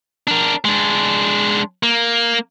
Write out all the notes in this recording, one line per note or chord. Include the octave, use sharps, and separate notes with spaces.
D4 A#4
G#3 D4
A#3